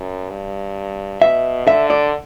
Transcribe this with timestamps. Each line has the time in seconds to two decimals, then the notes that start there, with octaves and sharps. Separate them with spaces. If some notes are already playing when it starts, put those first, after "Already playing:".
Already playing: F#2
0.29 G2
1.21 B2 E5
1.67 D3 E5
1.90 D5